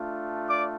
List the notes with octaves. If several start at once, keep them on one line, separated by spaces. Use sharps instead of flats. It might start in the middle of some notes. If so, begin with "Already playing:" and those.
Already playing: A3 D4 F4
D5 D6